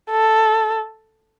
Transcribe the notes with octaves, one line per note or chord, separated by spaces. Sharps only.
A4